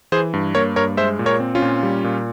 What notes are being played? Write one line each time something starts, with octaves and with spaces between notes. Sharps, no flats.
E3 G#4 C5
G2
A#3 A#4 C#5
G2 A#4 C#5
G#3 C5 E5
A#2
A#4 C#5
C4
C#4 F4
A#2
G3
A#2